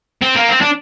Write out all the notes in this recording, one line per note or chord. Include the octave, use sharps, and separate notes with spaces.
C4
A#3
C4
D4